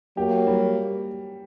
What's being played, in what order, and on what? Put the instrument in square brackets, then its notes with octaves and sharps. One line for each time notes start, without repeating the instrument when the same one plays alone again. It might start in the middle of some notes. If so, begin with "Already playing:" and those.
[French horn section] F#3 A#3 [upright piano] G4
[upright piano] G3